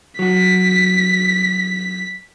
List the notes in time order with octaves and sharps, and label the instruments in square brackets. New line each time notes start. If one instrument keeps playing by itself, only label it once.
[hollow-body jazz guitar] F#3 F#4 [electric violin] B6